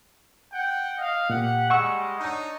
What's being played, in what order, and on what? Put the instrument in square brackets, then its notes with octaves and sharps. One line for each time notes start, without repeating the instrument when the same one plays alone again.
[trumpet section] F#5 G5
D#5 F5
[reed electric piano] A#2 [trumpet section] G4 F#5
[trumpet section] G3 G#3 [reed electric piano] F#5 C#6 E6
[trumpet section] D4 D#4 C#5